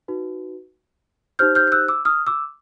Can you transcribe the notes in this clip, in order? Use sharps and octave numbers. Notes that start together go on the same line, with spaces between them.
D#4 F#4 B4
D#4 G4 C5 F6 G6
F6 G6
G6
E6 F#6
D6 E6
D#6 F6
D6 E6